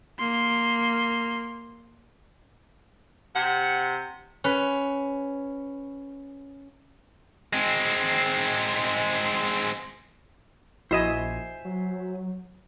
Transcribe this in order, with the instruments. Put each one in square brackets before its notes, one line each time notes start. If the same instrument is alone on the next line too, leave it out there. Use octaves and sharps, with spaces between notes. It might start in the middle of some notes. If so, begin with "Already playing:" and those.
[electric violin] A#3 C6
[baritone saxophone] C3 [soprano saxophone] F#5
[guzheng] C#4 B4
[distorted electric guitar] G#3 C4
[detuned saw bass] A#1 [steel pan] E4 F#4 D#5 [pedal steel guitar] C5 E5 G#5
[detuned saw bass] F#3